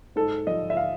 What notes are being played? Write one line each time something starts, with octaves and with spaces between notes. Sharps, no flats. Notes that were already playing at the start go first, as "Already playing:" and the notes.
G#2 A4
F3 D#5
E5
F5